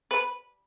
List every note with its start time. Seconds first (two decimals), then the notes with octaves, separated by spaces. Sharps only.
0.11 B4